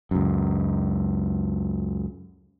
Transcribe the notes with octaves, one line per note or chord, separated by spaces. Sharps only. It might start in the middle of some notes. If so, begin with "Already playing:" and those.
C#2 F#2